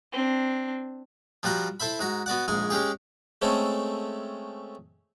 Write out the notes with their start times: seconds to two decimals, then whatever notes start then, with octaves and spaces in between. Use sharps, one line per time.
0.13 C4 D4
1.43 F3 G3 F#4 F#5 A#5
1.80 E4 A4 C5 E5 B5
2.00 G#2 F#4 A#5
2.26 B3 F#4 D5 F#5
2.48 A#1 G#2 G#3 G#5 C#6
2.70 G#3 C#4 G4 G#4
3.42 G#3 A3 C4 C#4 A4